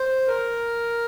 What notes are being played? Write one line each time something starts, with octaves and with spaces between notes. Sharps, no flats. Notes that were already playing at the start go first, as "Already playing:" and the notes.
Already playing: C5
A#4